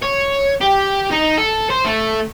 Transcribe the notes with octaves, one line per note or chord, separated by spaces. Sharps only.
C#5
G4
D#4
A4
C5
A3